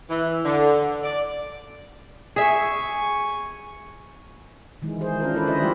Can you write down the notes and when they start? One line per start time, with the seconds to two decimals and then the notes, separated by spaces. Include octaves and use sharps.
0.09 E3
0.45 D3
1.04 D5
2.36 G#4 E5 G#5 C#6
4.82 D#3 E3 G#3
5.01 G#4 C5
5.20 C#4 D4 F4 A#4
5.34 E4 F4 A4 B4 C5 D5
5.46 D3 D4 E4 B4 D#5
5.60 E3 G3 A3 F4 G4 C5